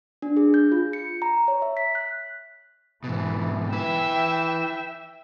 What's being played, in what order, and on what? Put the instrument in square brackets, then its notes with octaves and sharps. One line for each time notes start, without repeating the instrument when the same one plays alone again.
[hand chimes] D4
G#4
G6
F4
C#7
A#5
C#5
E5
B6
F#6
[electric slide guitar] G#2 B2 [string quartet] E3
[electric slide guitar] E4 B4 [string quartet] E5 G5